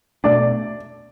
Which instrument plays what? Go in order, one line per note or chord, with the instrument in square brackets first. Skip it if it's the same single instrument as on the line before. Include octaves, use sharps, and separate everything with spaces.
[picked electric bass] B2 A3 D4 [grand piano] D5